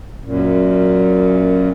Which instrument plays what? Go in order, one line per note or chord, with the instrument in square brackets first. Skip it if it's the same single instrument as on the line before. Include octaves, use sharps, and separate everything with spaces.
[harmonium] F#2 A#2